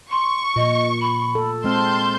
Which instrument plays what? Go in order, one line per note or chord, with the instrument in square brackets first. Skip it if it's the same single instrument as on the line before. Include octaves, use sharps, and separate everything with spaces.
[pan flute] C6 [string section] C#6
[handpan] A#2 [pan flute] D#5
[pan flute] B5
[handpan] A4
[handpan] G#3 C4 [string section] A5 C6 G6 [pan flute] F6